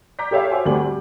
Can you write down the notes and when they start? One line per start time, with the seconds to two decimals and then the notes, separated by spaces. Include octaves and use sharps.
0.19 A#5 D6 G6 B6
0.31 G4 A4 C#5 E5 F5
0.51 F#4 C5 G#5 D6
0.65 D2 G3 A3 C4 G#5 F#7
0.82 G3